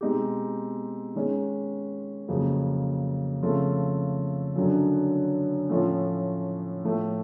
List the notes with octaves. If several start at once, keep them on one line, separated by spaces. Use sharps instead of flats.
B2 G#3 C4 D#4 G4
D#3 G#3 C#4
F2 C#3 F#3 A#3
C#3 F3 A3 C4 F4
F#2 D3 F#3
A2 F3 A3 C#4 F4
A2 F3 A3